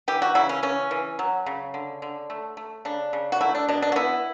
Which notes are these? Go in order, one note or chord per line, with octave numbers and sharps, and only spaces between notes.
E3 G4
F#4
C#3 E4
C#4
E3 C#4
E3
F#3
C#3
D3
D3
A3
A3
C#3 D4
C#3
F#4
A3 E4
D4
B2 D4
D4
F#4
B3 E4